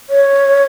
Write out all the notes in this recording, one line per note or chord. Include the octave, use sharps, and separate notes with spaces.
C#5